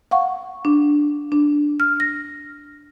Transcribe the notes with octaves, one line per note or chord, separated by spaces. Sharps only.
F5 F#5 C#6
D4
D4
F6
A#6